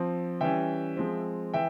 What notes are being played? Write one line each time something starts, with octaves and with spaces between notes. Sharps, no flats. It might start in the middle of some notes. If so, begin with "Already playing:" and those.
Already playing: F3 C4
E3 G3 C#4 E5 G5
F3 G#3 C4
E3 E5 G5